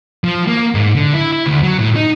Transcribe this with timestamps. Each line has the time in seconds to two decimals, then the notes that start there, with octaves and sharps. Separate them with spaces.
0.24 F3
0.48 A#3
0.75 G#2
0.96 D3
1.13 E4
1.33 E4
1.46 D2
1.63 F#3
1.79 A2
1.96 D#4